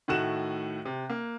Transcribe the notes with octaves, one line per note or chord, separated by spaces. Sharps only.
A2 D#3 A3 F#4 F#6 E7
C3
A#3